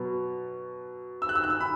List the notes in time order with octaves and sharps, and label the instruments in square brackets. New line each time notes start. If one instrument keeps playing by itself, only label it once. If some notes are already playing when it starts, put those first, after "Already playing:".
Already playing: [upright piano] B2 F#3 B3
E6
F#6
E6
F#6
E6
B5